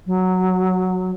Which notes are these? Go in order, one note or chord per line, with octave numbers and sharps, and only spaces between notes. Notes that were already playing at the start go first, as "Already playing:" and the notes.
F#3